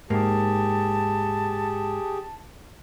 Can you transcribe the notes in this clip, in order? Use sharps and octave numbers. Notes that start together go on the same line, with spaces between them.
G#2 A#3 G4 G#4 A5